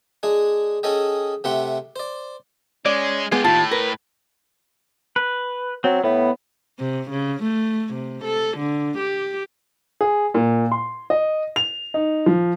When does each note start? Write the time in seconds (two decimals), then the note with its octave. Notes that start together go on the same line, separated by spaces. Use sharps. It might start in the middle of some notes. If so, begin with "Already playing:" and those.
0.23 G#3 D4 G#4
0.83 C#4 G#4 A4 D#5 G5
1.44 C3 A3 G4 F#5 G5 C6
1.96 C5 D5
2.86 G#3 C#4 D5
3.32 G#3 B3 F4 G4 G#4
3.44 D#2 A2 F4 A5
3.72 A#4 B4
5.16 B4
5.84 F#3 C4
6.04 A2 B3
6.79 C3
7.10 C#3
7.43 A3
7.94 C3
8.24 A4
8.57 D3
8.98 G4
10.01 G#4
10.35 A#2
10.71 C6
11.10 D#5
11.56 F7
11.94 D#4
12.26 F3